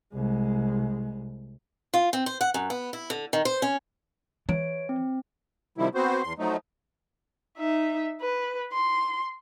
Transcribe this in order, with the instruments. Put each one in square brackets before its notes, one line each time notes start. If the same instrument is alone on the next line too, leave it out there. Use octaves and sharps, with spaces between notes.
[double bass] C2 G#3
[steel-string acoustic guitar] F4
C4
C5
F#5
F#2
B3
E4
D3
D#3
C5
C#4
[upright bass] E3 [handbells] C#5 D7
[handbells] C4
[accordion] C3 D#3 F3 G3 E4
B3 C4 F#4 C5
E2 C6
F3 F#3 A3 D#4
[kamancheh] D#4 E5
B4
C6